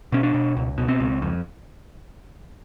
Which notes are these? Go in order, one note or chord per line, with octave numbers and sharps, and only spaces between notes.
B2 C#4
D4
B2
C#2
B2
C4
C#2
F2